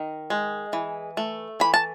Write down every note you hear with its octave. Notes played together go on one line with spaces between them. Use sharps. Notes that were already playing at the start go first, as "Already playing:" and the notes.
Already playing: D#3
G#3
E3
A3
E3 B5
A5